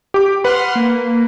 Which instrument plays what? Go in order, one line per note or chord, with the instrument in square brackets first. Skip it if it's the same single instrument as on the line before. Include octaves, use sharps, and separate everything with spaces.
[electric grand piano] G4 D6
[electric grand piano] B4 B5 [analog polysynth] F#5 C6 F6
[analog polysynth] A#3